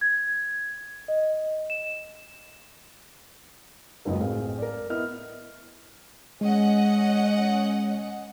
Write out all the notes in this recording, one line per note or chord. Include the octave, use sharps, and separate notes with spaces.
G#6
D#5
E7
F#1 C#2 F#2 B4 D#5
A1 C4 G#4 F5
A#4 D5
B3 E4 D#5 F6
G#3 C#4 D#5 F#5